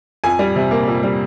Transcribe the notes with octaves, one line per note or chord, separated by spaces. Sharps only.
F2 G#5
G3
C3
A#3
F2
G3